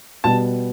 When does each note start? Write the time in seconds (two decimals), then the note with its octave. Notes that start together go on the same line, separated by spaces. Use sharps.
0.24 B2 G3 B3 A5